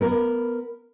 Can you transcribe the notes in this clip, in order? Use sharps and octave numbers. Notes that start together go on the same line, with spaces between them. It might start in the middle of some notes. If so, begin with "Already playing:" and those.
B3 A#4